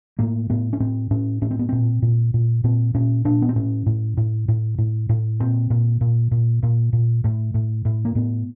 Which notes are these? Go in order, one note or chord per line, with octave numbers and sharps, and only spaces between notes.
A2 A#3
A2 B3
C#4
A2 C4
A2 C#4
A2 C#4
C4
B3
A#2 C4
A#2
A#2
A#2 C4
A#2 C#4
A#2 D4
B3
C4
A2 C#4
A2
A2
A2
A2
A2
A#2 C4
A#2
A#2
A#2
A#2
A#2
A2
A2
A2
A#3
A2 B3